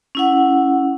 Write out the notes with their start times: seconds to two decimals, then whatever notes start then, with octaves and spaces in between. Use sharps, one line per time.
0.15 C#4 E4 F#5